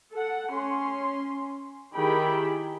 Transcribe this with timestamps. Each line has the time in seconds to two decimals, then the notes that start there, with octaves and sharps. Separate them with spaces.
0.12 A4 F#5
0.52 C#4 C6
1.94 D#3 E4 G4 G#4 G5 B5